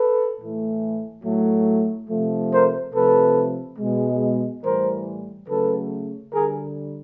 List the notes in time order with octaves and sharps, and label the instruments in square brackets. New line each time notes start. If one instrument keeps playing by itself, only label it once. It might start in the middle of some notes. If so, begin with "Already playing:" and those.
Already playing: [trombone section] A4 B4
A2 E3 A3
A2 F#3 A3
C3 F3 A3
A#4 C5
C3 F3 A3 A4 B4
B2 G#3
A2 E3 G3 A#4 C5
C#3 F#3 A3 A4 B4
D3 G3 G#4 A#4